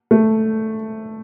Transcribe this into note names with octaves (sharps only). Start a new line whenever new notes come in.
A3